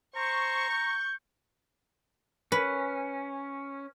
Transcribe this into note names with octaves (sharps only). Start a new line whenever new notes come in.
C5 A#5 C#6
G6
C#4 B4